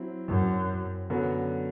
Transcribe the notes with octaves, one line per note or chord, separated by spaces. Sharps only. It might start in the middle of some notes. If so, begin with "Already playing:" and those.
Already playing: F#3 C4 E4
F#2
F#2 D3 F#3 B3 F#4